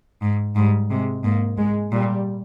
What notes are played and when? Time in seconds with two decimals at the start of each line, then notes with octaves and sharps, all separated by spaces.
0.22 G#2
0.56 G#2 G3
0.90 C3 G#3
1.24 G#2 A#3
1.58 G#2 G#3
1.92 A#2 G3